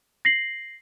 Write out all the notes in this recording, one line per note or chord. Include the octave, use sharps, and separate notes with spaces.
A#6 C7 F#7